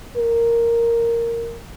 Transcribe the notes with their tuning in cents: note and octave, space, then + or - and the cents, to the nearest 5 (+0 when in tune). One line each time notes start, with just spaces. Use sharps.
A#4 -5